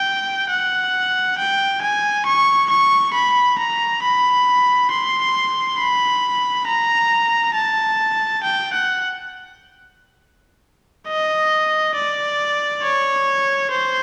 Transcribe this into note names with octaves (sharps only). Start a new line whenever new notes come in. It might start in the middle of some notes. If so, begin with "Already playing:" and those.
Already playing: G5
F#5
G5
G#5
C#6
C#6
B5
A#5
B5
C6
B5
A#5
A5
G5
F#5
D#5
D5
C#5
C5